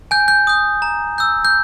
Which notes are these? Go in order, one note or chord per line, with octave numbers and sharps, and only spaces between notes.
G#5 G6
G6
D#6 G6
A#5
E6 G6
G6